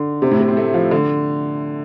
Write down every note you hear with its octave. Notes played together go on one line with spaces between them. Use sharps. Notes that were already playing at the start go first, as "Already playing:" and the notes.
Already playing: D3
C3
A2
C3
C4
A3
F3
D3